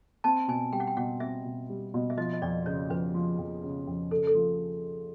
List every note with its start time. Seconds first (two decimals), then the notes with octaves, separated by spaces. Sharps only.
0.24 C4 A5
0.48 B2 G#5
0.72 G3 G5
0.80 F#5
0.87 G5
0.97 B2 F#5
1.20 C4 E5
1.45 B2
1.69 G3
1.94 B2
2.10 E5
2.17 F3 D#5
2.33 D#5
2.42 F2 D5
2.66 C#3 C#5
2.90 F2 B4
3.14 F3
3.39 F2
3.63 C#3
3.87 F2
4.11 C#3 A4
4.27 A4
4.35 F3